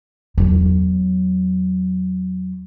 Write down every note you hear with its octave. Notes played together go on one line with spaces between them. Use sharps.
E2 F#3